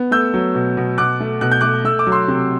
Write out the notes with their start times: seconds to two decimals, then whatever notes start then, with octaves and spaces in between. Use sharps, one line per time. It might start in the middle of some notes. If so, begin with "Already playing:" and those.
Already playing: B3
0.11 A3 E6 G6
0.34 F#3
0.55 B2
0.77 B2
0.98 B2 D6 F#6
1.20 A3
1.41 B2 F#6
1.52 G6
1.61 A3 D6 F#6
1.84 A3 E6
1.99 D6
2.07 F#3
2.12 C6 E6
2.28 C3